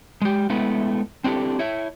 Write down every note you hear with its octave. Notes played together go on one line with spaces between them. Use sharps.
G#3 G4
G#3 A3 B3 E4
C4 D4 E4 G4 A4
E4 C#5 E5